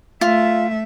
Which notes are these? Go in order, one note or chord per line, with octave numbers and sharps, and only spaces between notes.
A3 F4 E5